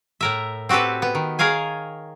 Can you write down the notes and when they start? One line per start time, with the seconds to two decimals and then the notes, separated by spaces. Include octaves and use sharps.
0.21 A2 A#4 E5
0.69 C4 F#4 G4 A4 B4
1.02 B3
1.15 D#3
1.39 G#4 A#4 C#5 F5 G#5